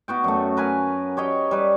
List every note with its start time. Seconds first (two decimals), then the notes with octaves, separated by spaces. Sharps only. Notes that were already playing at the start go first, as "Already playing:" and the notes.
0.08 B3 F#4 G5
0.24 F#2 A3
0.57 A#4 B4 G#5
1.17 G4 C#5 D#5 G5
1.51 G3 B4